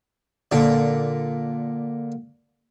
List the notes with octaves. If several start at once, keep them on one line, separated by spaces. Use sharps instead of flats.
A#2 D3